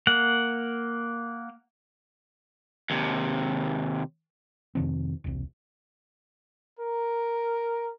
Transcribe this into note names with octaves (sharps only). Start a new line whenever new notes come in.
A#3 F#5
D#2 C3
F2 C3 D#3 C4
E1 C2
A#4